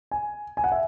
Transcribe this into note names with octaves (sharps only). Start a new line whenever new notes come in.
G#5
G#5
F#5
E5